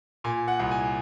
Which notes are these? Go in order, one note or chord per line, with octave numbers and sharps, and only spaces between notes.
A#2 G#5
F#5
C2
G#5